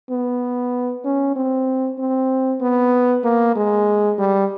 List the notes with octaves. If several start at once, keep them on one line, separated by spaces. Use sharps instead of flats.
B3
C#4
C4
C4
B3
A#3
G#3
G3